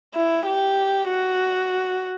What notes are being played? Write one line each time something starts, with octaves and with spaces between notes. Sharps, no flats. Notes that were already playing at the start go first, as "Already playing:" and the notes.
E4
G4
F#4